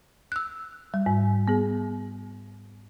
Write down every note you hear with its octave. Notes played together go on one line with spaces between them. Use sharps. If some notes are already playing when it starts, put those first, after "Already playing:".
E6 F#6
G3
G#2
B3 G#4